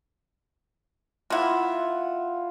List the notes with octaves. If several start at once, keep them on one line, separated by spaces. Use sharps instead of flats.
A#3 E4 F4 F#5